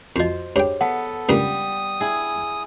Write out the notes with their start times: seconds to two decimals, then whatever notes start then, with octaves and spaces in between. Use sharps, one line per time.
0.16 F2 F3 F#4 C5 D#5
0.56 G2 G#4 C#5 G5
0.81 B3 A4 F#5 A5
1.29 C#2 G2 G3 A#3 D#6
2.00 E4 G#4